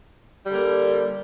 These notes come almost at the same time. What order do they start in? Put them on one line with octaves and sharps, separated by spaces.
G3 D3 A#3